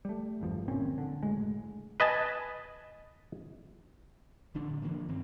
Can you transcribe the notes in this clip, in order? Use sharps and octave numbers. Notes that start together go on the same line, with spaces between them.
G3 A3
G#1 E2 G2 F3
G1 A#2 C4 C#4
D3
F#1 A2 G#3
B4 D#5 G#5 A5
A1 D3 D4
A2 D3
E3 F3 A#3 D4
G2 D#3 C4